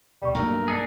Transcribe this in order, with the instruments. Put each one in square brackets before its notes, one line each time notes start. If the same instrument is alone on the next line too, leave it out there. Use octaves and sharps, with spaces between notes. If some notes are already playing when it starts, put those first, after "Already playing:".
[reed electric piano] D2 B2 C#6 [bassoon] G3
[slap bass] B1 G2 A3 [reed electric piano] A#3 [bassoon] A#4
[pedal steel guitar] D4 D#4 G#4